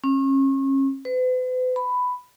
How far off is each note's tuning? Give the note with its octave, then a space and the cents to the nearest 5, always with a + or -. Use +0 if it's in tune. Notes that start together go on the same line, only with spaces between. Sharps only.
C#4 -35
B4 +45
B5 +10